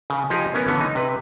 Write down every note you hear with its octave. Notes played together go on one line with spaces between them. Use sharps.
C#3
F3 D#4 G4 G#4
B3 C#4 A#4 C#5 E5 G#5
D3 E3 B3 C#4
D#4
C3 B4